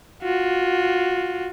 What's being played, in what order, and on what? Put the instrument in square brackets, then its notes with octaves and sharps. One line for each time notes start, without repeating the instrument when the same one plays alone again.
[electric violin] F4 F#4